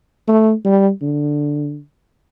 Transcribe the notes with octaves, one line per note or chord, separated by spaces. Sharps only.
A3
G3
D3